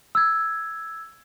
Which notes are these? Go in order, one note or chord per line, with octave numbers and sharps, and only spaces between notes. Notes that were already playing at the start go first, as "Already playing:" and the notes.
E6 G#6